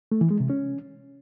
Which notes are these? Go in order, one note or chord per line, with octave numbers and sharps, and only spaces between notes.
A3
E3
G#3
C3
C#4